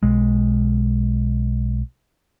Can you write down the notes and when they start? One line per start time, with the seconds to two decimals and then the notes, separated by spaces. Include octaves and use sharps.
0.03 B1 G#3